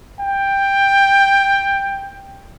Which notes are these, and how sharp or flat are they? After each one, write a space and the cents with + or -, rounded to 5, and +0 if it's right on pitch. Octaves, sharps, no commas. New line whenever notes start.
G5 +10